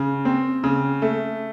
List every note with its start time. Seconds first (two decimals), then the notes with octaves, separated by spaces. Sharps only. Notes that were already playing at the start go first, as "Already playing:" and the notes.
Already playing: C#3
0.25 C4
0.64 C#3
1.02 A3